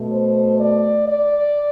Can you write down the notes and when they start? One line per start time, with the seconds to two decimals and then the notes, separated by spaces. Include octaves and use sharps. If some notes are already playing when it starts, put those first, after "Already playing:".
Already playing: B2 A3
0.12 C5
0.58 D5
1.07 D5